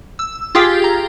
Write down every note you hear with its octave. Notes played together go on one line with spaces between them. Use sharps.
E6
F4 G4 G#4 F5 G5
A#5